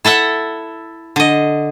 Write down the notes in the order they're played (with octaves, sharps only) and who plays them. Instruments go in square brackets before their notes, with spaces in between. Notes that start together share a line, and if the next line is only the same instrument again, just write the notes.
[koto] E4 A4 E5 F#5
D3 D#5